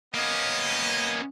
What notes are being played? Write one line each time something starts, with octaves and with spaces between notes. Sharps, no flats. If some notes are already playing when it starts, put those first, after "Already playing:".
A#3 B3 C#4 D#5